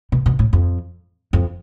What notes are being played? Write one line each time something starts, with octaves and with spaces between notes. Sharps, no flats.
B2
B2
A2
F2
F2